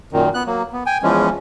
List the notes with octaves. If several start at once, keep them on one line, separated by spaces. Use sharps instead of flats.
F#2 A#2 D#3
B3 F#6
F#3 A#3
B3
G5 G#5
E2 E3 F3 G#3 C#4